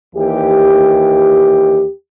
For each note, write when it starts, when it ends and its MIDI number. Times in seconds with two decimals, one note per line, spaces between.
0.15 1.86 39
0.15 1.86 52
0.15 1.86 67